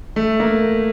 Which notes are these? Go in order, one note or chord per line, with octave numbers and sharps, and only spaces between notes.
A3
A#3